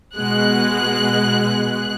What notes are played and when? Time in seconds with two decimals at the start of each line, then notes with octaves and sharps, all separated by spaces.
0.17 B2 G#3 F#6